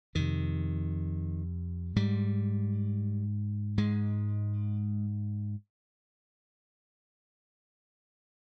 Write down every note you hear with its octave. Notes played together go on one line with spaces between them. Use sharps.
F2 C3 D#3
G#2 G3
G#2 G#3